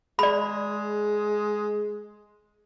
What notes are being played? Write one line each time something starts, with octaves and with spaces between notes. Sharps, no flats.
G#3 D5 B5